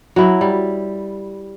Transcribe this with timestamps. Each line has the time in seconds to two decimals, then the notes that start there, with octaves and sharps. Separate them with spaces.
0.16 F#3 E4
0.41 G3